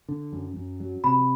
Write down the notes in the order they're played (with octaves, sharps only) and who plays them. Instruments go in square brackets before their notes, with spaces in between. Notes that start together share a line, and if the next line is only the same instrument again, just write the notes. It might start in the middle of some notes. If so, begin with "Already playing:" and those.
[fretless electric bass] D3
F#2
F#2
F#3
[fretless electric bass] C3 [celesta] B5